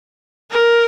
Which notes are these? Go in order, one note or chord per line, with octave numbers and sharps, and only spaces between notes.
A#4